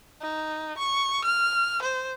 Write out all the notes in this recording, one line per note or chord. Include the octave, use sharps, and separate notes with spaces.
D#4
C#6
F6
C5